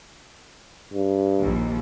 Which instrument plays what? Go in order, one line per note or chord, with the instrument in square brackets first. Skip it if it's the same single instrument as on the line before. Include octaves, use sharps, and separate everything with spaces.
[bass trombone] G2
[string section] A#1 D#2